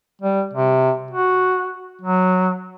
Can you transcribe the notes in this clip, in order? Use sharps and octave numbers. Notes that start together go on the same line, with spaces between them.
G3
C3
F#4
F#3